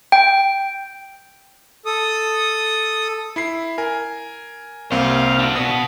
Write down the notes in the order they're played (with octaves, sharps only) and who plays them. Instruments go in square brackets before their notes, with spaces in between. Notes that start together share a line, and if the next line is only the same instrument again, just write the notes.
[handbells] G5
[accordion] A4 D#6
[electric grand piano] E4 B5 C7
A#4 G#5
[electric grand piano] C2 A#3 C4 [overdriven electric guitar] F5
[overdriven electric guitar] D4 F#4
[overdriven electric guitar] B2 B3 [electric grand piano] D#6